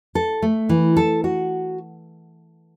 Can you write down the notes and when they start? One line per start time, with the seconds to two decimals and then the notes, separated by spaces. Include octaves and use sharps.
0.15 A4
0.42 A3
0.69 E3
0.97 A4
1.24 F#4